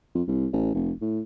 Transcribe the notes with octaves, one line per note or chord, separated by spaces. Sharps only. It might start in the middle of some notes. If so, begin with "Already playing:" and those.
F2
C2
A1
F1
A2